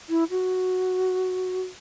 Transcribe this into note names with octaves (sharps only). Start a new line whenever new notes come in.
E4
F#4